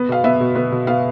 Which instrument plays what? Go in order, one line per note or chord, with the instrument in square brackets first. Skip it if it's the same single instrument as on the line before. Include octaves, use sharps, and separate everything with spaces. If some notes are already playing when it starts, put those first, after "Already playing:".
Already playing: [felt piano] B3
B2 F5
B3 E5
B2
B3
B2
B3 F5